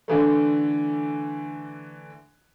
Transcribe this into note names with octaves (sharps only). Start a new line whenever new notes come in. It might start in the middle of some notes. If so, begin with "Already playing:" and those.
D3 E3 A3